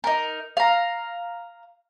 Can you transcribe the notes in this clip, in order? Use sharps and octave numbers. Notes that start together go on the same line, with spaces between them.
D#4 A#4
F5 A#5